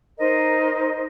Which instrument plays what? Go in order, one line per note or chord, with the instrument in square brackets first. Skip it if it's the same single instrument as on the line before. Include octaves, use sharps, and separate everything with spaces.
[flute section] D#4 A#4 C5 D#5